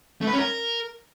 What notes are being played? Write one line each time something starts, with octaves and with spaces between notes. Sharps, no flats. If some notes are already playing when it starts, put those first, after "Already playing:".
A3
B4
C#4
A#4